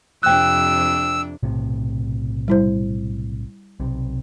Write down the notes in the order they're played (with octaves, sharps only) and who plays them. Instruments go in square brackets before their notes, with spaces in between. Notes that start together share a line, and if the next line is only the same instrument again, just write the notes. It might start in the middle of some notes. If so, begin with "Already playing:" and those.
[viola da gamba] F2 C3 D4 [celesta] G5 F#6 [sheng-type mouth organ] E6
[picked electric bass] B1 A2 C3
[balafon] G3 E4 C5
[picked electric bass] B1 C3